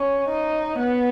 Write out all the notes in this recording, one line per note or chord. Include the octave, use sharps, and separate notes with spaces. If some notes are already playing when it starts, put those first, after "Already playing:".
Already playing: C#4
D#4
B3